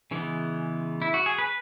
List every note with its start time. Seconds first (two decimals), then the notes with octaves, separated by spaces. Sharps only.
0.11 C#3 E3 G#3 B3
1.02 E4
1.14 F#4
1.26 G#4
1.38 B4